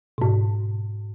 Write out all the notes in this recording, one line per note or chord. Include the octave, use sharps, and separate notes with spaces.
G#2 B2